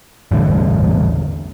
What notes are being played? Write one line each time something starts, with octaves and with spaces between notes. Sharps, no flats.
A1 E2 D3 G3